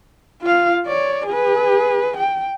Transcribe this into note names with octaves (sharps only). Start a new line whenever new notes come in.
F4 F5
C#5 D5
G#4 B4
G5